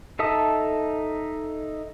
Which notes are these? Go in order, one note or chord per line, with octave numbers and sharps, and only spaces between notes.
D#4 A4 E5 A5 D#6